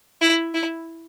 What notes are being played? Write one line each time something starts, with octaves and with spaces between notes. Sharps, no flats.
E4
E4